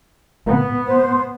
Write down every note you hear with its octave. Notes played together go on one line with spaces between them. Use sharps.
B3
C5